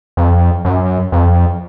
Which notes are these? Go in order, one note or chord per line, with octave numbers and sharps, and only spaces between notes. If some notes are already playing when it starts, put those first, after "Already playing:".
F2
F#2
F2